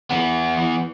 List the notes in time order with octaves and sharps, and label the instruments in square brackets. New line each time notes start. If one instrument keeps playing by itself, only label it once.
[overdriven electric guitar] E3 B3